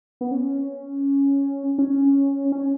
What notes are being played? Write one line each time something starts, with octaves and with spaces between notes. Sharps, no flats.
B3
C#4
C#4
C#4